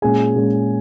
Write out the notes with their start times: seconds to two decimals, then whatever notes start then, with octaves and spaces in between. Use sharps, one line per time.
0.02 A#2 G#3 C#4 G#4 G#5
0.35 A#2 G#3 C#4